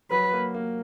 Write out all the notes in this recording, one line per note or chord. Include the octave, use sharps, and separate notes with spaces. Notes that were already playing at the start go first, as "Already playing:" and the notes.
F#3 B4
A#3
A#3